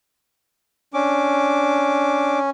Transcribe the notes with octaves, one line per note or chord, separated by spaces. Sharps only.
C#4 D4 D6